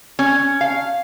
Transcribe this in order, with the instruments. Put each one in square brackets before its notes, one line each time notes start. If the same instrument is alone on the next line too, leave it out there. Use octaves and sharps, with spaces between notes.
[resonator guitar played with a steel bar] C#4
F5